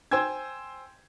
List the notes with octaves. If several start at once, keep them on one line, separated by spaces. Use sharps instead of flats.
C5 G5 G#5 E6 G#6